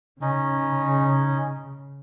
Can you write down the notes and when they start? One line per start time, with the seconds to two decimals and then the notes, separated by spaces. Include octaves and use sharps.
0.22 C#3 C#4 D#4